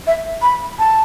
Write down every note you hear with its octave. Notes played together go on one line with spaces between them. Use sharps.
E5
B5
A5